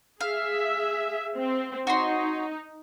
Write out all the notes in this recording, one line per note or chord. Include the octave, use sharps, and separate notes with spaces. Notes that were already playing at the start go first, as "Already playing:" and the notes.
G#4 E5 F5
C4
D#4 F#4 C#5 C6